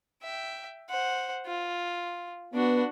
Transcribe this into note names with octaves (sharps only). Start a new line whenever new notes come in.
E5 G5
C5 F#5
F4
B3 D4 F#4